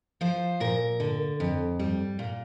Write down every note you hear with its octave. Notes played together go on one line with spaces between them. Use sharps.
F3 C5
A#2 A#4
D3
F2
G3
A#2